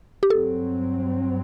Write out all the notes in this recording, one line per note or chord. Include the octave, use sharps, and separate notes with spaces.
G4
G2 F#3 C4 A4